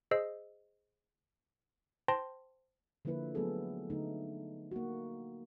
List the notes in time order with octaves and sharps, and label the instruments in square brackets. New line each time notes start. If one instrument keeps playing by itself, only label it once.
[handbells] G#4 C5 D#5 E6 C7
C5 G5 A5 C6 A#6
[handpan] D3 F3 A#3 E4 B4
F#3 A3 B3 G#4 A4
D3 A3 D#4
A#3 F#4